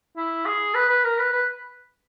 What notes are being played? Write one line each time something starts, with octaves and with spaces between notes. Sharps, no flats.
E4
G#4
B4
B4
A#4
B4
B4